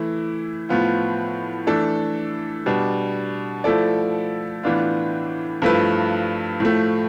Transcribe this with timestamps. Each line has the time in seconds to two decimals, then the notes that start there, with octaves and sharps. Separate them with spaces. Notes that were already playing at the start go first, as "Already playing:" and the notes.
Already playing: E3 A3 E4
0.69 A2 F3 B3 F4
1.67 E3 A3 D4 A4
2.66 B2 G3 D4
3.64 F3 A3 E4 A4 D5
4.63 A2 E3 B3 D4 F4
5.62 G2 F3 A3 E4 B4
6.60 A2 F3 A3